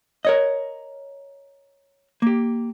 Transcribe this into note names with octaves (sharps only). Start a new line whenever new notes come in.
A#4 C#5 D#5
A#3 G4